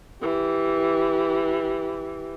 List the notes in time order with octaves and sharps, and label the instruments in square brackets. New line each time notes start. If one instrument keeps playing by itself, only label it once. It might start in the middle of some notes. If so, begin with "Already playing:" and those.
[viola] E3 G4